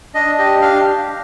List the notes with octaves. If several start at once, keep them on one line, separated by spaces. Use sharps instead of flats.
D4 D#5
G4 D#5
D4 F5